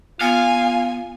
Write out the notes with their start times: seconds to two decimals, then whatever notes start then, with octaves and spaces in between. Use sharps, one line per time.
0.21 B3 F4 F5 G#5